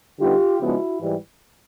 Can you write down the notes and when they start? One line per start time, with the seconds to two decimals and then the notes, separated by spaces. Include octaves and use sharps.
0.19 D3 G3 B3 D#4 F4 G4
0.60 C#3 F3 G#3 B3 D4 E4 F#4
1.00 G#2 E3 G3